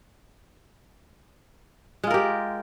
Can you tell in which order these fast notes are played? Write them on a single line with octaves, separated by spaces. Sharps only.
G#3 F4 A#4 G4